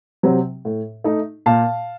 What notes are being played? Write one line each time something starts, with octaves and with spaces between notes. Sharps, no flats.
C3 F#3 C4
A2
A3 D#4
A#2 F5 A5